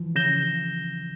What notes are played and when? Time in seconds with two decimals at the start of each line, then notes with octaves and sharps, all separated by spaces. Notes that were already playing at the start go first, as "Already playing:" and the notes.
Already playing: E3 F3
0.15 C#3 G6 A#6 E7 G7